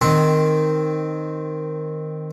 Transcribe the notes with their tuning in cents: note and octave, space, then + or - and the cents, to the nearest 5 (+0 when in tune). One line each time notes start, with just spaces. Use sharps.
D#3 -5 C4 +0 C6 +0